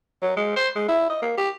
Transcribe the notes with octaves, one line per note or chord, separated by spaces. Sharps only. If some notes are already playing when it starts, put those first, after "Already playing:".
F#3
G#3
C5
G#3
E4
D#5
A#3
G4